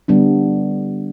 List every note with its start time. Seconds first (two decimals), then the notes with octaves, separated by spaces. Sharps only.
0.08 D3 G3 B3 D4